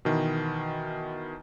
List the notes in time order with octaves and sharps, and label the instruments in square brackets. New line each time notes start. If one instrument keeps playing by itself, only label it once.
[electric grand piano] B2 D#3 E3